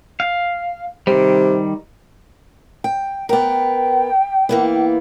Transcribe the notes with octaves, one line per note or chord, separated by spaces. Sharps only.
F5
C3 D#3 G3
G5
B3 A#4 G5
E3 A#3 B3